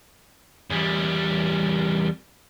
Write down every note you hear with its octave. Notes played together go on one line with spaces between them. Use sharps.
E2 G3